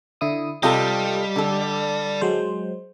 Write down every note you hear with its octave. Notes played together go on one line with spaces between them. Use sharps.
D3 E4 D#6
C3 G3 F4 G4 A4 D#5 G5
D3 A4
F#3 G#3 C5